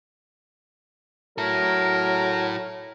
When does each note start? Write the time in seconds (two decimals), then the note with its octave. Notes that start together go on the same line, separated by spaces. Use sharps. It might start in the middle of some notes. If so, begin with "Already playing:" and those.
1.38 F#3 E4 A4 A#4